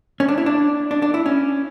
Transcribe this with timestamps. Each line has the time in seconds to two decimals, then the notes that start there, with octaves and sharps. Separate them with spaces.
0.20 C#4
0.28 D4
0.38 E4
0.46 D4
0.91 D4
1.02 D4
1.14 E4
1.26 C#4